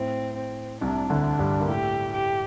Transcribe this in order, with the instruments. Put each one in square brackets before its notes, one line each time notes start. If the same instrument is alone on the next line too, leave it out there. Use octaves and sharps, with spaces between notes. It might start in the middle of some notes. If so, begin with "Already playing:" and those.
Already playing: [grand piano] A2 [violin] C4
[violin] C4
[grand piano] C2 C3 [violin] D4
[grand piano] D2 D3
[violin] D4
[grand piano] G2 G3
A#3
[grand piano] A2 A3 [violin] G4
[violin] G4